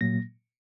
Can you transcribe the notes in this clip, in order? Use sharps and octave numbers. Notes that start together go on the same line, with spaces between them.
A#2 F#3 A#3 A#6